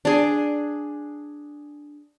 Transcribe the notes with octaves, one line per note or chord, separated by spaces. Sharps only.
D4 G#4